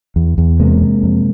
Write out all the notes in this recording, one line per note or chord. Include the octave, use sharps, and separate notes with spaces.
E2
E2
C3 G#3 A#3
C3
F2